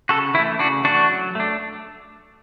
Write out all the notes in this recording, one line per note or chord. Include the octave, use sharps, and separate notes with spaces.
C#3 F#4 A4
E3 A3 E4
C#3 D4 F#4
E3 A3 D4 F#4
F#3
A3 D4